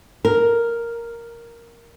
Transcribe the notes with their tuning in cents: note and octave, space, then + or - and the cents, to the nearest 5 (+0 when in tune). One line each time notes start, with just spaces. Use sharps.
A#4 +0